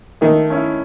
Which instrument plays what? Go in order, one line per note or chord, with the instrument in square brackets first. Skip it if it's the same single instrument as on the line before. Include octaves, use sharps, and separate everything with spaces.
[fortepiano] D#3 [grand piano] A3
[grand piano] C#4 E4